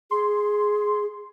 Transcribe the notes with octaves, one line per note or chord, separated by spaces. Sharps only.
G#4 C6